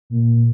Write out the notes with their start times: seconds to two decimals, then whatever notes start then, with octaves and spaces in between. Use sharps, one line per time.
0.10 A#2